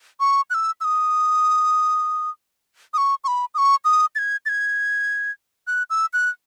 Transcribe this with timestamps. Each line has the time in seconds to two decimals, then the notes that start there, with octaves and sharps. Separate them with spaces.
0.20 C#6
0.50 F#6
0.54 E6
0.81 E6
0.84 D#6
2.93 D#6
2.98 C#6
3.24 C#6
3.27 B5
3.54 D#6
3.58 C#6
3.84 D#6
4.15 A6
4.18 G#6
4.46 A6
4.49 G#6
5.67 F#6
5.90 E6
6.13 F#6